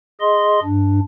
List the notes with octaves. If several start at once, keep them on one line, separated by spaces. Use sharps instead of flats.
G#4 D#5 C6
G2 D4